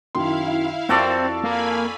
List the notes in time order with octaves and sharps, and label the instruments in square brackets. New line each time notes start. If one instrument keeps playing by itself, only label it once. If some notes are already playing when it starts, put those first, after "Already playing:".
[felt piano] F#2 D#3 C6 [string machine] E4 F5
[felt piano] F2 [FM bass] C4 [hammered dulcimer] F#4 A4 D5
[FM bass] A#3 [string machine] F5 G#5 B5